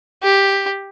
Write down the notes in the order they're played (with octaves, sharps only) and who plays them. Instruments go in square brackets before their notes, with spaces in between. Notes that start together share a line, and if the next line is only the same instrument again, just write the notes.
[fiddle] G4